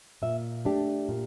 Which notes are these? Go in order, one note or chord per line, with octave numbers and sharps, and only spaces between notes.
A#2 E5
A3 D4 G4
A#2